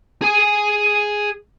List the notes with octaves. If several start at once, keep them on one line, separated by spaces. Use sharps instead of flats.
G#4 G#5